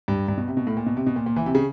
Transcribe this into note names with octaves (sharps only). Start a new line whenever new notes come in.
G2
G2
B2
C3
B2
A2
A#2
B2
C3
B2
A#2
A#2
E3
C3
C#3